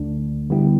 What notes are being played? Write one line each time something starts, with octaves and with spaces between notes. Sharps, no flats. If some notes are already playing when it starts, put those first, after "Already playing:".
Already playing: D2 D3 A3 D4
D3 G3 B3 E4 G4